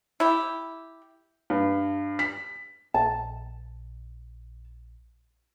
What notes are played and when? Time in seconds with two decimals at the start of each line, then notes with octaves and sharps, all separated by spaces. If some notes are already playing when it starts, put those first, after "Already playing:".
0.20 E4 G4
1.50 G2
2.19 B6
2.94 A#1 A5